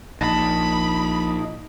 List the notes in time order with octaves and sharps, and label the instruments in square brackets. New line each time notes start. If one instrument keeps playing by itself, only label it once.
[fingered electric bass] A#1 [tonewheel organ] D#4 [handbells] A5 A6 A#6 [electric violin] B5